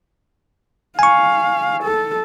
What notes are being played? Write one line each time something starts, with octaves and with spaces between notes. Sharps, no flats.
F5 G#5 C#6
A4